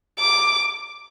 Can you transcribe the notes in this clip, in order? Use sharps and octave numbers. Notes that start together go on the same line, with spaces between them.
D6